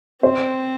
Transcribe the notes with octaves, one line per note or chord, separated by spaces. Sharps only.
C4 C5